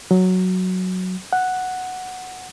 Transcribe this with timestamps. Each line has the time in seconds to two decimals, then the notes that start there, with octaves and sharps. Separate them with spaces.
0.11 F#3
1.33 F#5